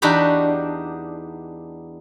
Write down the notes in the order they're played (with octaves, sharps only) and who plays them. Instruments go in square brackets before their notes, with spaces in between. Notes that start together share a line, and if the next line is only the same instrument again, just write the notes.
[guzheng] E2 D4 D#4 F#4 G4 B5